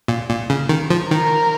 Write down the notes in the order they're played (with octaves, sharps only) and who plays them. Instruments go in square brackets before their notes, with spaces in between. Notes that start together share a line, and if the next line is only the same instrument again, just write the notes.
[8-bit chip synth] A#2
A#2
C#3
D#3
F3
[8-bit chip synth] D#3 [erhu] A#4